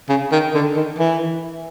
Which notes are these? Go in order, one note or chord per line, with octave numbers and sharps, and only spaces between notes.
C#3
D#3
D3
D#3
E3